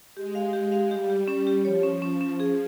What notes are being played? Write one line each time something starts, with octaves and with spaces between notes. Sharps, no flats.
G#3 G4
F5
G4
F5
G3 G4
G4
C#4
G4
F3 C#5
C#4
C#4
C#4
G#4